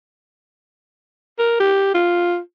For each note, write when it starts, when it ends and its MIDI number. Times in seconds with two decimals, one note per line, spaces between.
1.38 1.57 70
1.60 1.90 67
1.94 2.39 65